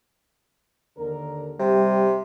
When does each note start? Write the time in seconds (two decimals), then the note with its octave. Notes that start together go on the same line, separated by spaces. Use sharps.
0.98 D#2 D3 A#4
1.60 C3 G3 G4